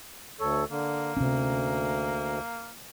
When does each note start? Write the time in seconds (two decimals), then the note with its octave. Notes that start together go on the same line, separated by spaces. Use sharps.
0.40 D2 A4 C#5
0.70 D3 A#3
1.17 D2 C3 C4 C#4